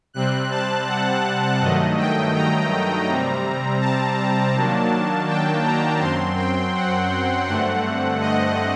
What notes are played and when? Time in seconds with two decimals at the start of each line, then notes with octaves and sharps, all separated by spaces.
0.14 C3 G3 C4 F#6
0.51 A5
0.87 F#5
1.61 G2 D#3 F#3 A3 D#5
1.98 G5
2.34 A#5
3.07 C3 G3 C4
3.81 A5
4.54 D#3 F#3 A#3 D4
5.28 G5
5.63 A#5
6.00 F#2 F#3 C4 C6
6.36 G5
6.74 F#5
7.47 G2 D3 A3 C4 F#5
8.20 D#5